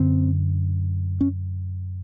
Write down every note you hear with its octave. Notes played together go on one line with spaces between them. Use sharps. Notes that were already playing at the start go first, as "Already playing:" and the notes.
Already playing: F#2 D3 C4
C#4